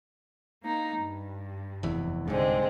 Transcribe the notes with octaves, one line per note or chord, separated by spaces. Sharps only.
A#3 D#4
G2
F1 E2 E3
C2 G#2 D3 G#3 C4